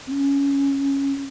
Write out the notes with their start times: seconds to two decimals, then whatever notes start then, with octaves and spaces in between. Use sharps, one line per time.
0.07 C4
0.11 C#4